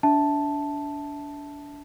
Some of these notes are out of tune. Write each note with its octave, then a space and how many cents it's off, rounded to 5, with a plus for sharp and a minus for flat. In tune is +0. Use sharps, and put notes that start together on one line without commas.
D4 -25 E5 -15 A5 +0